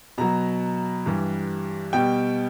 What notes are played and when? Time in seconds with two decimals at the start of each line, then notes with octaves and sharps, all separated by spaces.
0.18 B2 F#3 A#5
1.06 G2 E3 G3
1.93 B2 G3 G5